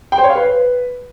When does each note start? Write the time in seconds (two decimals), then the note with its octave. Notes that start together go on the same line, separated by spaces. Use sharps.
0.12 G5
0.18 C5
0.24 C#5
0.30 F5
0.36 B4